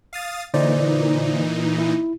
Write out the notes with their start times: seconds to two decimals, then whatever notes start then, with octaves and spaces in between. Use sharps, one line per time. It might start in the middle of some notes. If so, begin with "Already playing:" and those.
0.13 F5 D#6 A6
0.54 A#2 D3 E3 D#4 C5 D5
1.79 E4